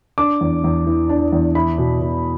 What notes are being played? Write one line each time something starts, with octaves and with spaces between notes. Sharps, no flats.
D4 D6
E2
E2
E3
D4
E2
E4 B5
B2
B2